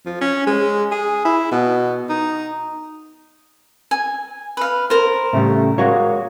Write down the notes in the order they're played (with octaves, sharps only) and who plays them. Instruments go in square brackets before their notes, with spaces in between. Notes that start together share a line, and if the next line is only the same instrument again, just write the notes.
[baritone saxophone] F3
C#4
G#3
G#4
E4
B2
D#4
[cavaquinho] G#5
B4 F5
A#4 C5
[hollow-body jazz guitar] A2 C#3 G3 [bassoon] A3
[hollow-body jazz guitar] G#3 F#4 C#5 [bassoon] A#3